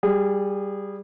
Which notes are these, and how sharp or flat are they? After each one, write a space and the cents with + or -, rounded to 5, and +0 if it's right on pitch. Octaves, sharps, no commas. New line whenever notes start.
G3 +0 G#4 -20